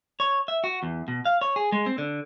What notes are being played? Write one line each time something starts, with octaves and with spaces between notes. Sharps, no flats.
C#5
E5
F#4
E2
B2
F5
C#5
G#4
G#3
C4
D3